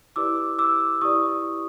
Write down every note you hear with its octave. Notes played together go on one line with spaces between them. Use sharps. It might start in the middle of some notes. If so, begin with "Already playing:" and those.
E4 G4 B4 D5 D6 E6
D6 E6
E4 G4 B4 D5 C#6 D#6